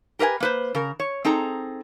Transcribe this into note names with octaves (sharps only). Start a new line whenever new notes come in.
G4 A#4 B4 F5 G#5
A#3 B4 C5
C#3 A#4
C#5
C4 D#4 G#4 A4 A#5